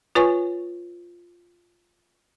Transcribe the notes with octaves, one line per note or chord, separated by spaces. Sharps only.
F4 B4 C#5 G#5 C#6